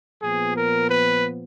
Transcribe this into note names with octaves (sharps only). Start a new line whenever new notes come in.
A#2 F3 B3 G#4
A#4
B4